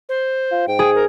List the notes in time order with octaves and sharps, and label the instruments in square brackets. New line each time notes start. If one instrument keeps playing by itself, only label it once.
[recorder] C5
[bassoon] F4
[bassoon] G#2 [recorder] G5
[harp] G#4
[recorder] A#4